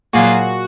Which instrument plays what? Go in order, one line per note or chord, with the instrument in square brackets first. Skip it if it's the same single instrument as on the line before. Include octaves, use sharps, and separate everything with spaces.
[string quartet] A#2 F#3 A#3 F4 G#4 [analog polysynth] F#4